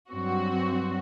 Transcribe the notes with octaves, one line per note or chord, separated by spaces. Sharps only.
G2 F#3 C4 F#4